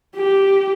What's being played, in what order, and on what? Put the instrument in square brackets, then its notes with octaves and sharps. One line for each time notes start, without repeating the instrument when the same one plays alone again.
[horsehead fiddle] G4